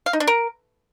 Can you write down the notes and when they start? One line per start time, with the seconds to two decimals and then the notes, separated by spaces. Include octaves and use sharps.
0.06 F5
0.13 D#4
0.20 D4
0.27 A#4